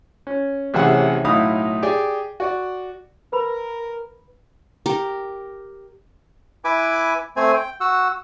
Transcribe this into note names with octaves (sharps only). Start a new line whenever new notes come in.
C#4
A1 C3 E3 C#4 G#4 F#5
B1 A2 D#4 E4 F5 D#6
G4 G#4 D5 G5
F#4 D5
A#4 B4 B5
G4 A#4
E4 B4 G#5 D6
A3 C4 C5 G#5
G5
F#4 F#5 E6